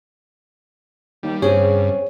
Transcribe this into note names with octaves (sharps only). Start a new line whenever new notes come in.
D#2 G3
G2 C#3 C4 G#4 C#5